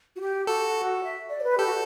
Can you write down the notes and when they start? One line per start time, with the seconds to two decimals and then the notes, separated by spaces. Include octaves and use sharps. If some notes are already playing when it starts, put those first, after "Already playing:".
0.14 F#4
0.20 G4
0.47 F#4 A4
1.03 E5
1.30 D5
1.39 C#5
1.44 B4
1.58 G4 A4
1.67 F#4